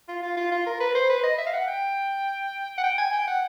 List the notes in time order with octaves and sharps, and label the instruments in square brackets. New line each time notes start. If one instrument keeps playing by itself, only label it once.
[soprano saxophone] F4
F4
F4
F4
A#4
B4
C5
B4
D#5
E5
F5
F#5
G5
F#5
G5
G#5
G5
F#5